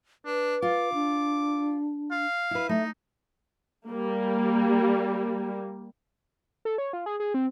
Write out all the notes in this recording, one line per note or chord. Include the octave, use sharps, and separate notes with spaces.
D4 B4
F4 D6
D4
F5
E4 B4
A3 D#4 E5
G3 A#3
A4
C#5
F4
G#4
G#4
C4